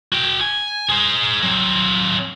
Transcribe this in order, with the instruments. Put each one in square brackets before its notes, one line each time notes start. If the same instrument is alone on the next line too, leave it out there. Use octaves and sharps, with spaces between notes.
[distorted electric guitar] F#4 G5
G#5
G#4 C5
F#3 C4